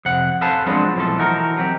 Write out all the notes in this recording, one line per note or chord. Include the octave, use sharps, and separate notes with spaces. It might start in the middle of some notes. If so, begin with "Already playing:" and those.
F2 C3 F#5
A4 B4 C5 F5 G#5 A5
F3 F#3 G#3 B3 C4 D4
B1 E3 F3 A3 A4
E3 D#4 F#4 A4 A#4
F#3 C4 G4